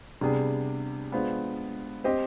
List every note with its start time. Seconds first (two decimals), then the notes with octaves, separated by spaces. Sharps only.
0.21 C3 G3 B3 D4 G#4
1.12 G#3 B3 D4 F4 C5
2.04 C4 G4 C5 D#5